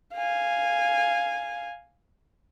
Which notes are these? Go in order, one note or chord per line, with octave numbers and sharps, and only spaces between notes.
F5 G#5